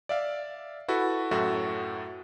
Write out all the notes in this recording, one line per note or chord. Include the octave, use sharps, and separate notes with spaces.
D5 E5 F5
E4 F#4 A4 B4
F#2 A2 F#4 A4 E5